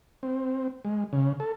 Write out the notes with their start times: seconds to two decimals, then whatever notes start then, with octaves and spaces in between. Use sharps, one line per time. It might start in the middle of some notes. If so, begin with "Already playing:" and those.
0.23 C4
0.85 G#3
1.13 C#3
1.40 A4